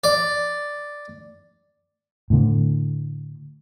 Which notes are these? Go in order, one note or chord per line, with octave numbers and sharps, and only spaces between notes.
D5
A2 D3